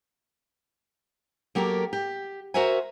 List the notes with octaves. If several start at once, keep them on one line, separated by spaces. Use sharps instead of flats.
F#3 A#3 G4 A4 A#4
G4
F#4 A#4 C5 E5 F#5 G#5